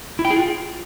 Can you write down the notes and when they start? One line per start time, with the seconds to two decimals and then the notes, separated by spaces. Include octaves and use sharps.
0.19 E4
0.25 G5
0.30 G#4
0.36 F4